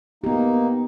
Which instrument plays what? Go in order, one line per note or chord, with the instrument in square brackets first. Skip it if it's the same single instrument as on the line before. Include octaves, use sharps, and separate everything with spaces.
[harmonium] A#3 D#4 [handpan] B3 G4